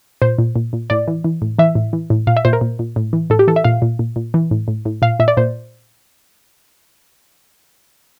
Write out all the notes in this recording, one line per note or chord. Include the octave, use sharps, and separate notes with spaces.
A#2 C5
A#2
A#2
A#2
A2 D5
E3
E3
A2
E3 E5
A2
E3
A2
A#2 F5
E5
A#2 C5
A#4
A#2
A#2
A2
E3
A2 A4
G4
E3 A4
E5
A#2 F5
A#2
A#2
A#2
E3
A2
A2
A2
A#2 F5
A#2 E5
D5
A#2 C5